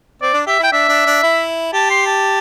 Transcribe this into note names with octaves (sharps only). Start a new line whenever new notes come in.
C4 D5
D4
G4 E5
E4 G5
D4 E5
D4
D4
E4
G4 A5
C6
A5